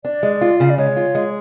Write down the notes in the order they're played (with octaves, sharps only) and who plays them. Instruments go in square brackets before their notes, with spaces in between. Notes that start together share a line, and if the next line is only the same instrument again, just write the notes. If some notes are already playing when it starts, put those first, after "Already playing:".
[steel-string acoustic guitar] D4 [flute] D5
[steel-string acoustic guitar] G#3
F4
[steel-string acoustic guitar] C#3 [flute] F5
[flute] D5
[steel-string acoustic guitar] G#3 [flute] C#5
[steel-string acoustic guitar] F4
G#3